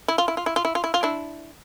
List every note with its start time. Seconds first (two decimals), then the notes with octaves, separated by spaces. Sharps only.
0.08 E4
0.18 F4
0.28 E4
0.37 F4
0.46 E4
0.56 F4
0.65 E4
0.75 F4
0.84 E4
0.94 F4
1.03 D4 E4